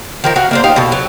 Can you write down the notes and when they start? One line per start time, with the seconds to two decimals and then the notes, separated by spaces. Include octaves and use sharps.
0.24 D#3 F3 A#4
0.36 F#4 F5
0.51 A#3 D4 C5
0.64 D#4 G4 F5
0.76 B2 A4
0.92 F#3